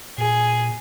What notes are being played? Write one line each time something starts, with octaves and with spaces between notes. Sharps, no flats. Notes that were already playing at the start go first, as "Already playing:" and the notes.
A#2 G#4